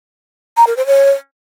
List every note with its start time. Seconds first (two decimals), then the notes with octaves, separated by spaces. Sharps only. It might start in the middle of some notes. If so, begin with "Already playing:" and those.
0.57 A#5
0.67 A#4
0.77 C5
0.87 C#5